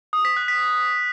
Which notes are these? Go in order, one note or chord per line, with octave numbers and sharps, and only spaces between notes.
D#6
B6
F#6
B6